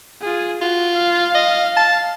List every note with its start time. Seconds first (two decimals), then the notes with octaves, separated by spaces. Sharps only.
0.21 F4 G#4
0.61 F4 F#4
0.94 F5
1.35 D#5
1.77 A5